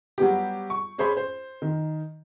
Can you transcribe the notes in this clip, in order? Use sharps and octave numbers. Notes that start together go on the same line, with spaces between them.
F#3 G3 B3 G4
C#6
C#4 G#4 C5 C#5 B5 C6
C5
D#3